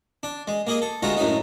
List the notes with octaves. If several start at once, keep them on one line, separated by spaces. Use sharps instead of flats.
D4
G#3
A#3 G#4 D#5
A4
D2 G#3 F4 F#4 A#5
F#2 A2 F#3 D#4